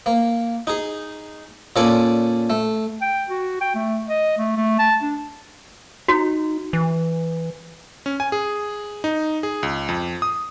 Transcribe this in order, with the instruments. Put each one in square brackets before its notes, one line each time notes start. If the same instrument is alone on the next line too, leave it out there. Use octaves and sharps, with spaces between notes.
[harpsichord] A#3
D#4 G#4
A#2 C#4 A4 D5 G#5
A3
[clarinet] G5
F#4
G5
A3
D#5
A3
A3
A5
D4
[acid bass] D#4 [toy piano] F#4
[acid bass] E3
[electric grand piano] C#4
G#5
G#4
D#4
G#4
C#2
F2
D#6